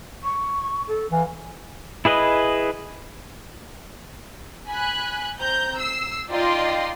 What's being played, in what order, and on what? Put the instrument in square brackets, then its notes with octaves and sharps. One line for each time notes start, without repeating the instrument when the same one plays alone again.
[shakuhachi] C#6
A4
[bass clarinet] E3 [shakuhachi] F5
[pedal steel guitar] E4 G#4 B4 D#5
[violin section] G#5 B5 F#6
C4 A#5 G6
E6 C7
D#4 F4 D5 D#5 G5 C6